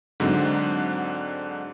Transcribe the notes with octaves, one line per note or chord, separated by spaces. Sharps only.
G#2 D3 F#3 C4 D4 D#4